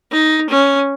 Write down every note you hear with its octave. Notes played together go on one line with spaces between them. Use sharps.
D#4
C#4